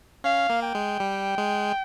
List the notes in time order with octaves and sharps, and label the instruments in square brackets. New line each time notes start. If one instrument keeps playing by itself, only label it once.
[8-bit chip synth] C#4 [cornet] F5
[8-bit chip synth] A#3
[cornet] G5
[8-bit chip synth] G#3
G3
G#3